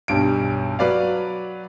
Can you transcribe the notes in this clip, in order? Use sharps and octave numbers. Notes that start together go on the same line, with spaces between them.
B1 G2 D7
F#3 B4 D5 F5